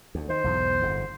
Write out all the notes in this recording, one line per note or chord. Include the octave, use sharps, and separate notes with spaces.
D2
D#3 C5
B1 E2 G#2
G1 F2 G#2